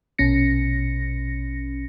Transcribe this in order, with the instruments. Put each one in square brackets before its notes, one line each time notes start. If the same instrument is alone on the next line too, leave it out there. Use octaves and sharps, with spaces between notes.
[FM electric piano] A#1 B2 C#4 A#6 C#7